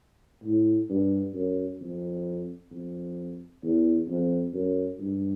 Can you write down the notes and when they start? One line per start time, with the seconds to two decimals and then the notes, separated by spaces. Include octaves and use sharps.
0.44 A2
0.90 G2
1.34 F#2
1.81 F2
2.71 F2
3.63 E2
4.08 F2
4.54 F#2
5.00 G2